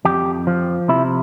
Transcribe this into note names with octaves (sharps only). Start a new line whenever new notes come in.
F2 G4
F3
C3 E4